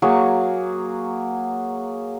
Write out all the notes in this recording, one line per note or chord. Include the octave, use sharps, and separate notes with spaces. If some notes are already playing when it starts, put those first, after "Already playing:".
F#3 A#3 G#4 C#6